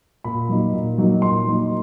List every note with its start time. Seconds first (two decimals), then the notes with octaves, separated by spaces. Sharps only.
0.24 A#2 B5
0.49 F#3 A#3 D#4
0.73 A#2
0.98 F#3 A#3 D#4
1.22 A#2 C6
1.47 F#3 A#3 D#4